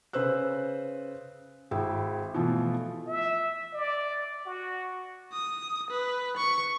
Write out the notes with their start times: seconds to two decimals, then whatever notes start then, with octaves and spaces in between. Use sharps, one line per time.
0.13 C#3 B4 C5 E6 F#6
1.71 G#1 E4 G#4 G5 E6
2.34 B2 E3 F3 A3 F4 A4
3.07 E5
3.73 D5
4.46 F#4
5.33 D#6
5.91 B4
6.37 C#6